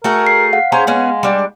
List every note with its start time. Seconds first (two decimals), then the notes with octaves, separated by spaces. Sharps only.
0.04 A3 F#4 G#4 A#4
0.27 C7
0.53 F5 F#5
0.72 C#4 G#4 C5 A#5
0.87 G#3 B3 C#4 G#4
1.23 G3 D4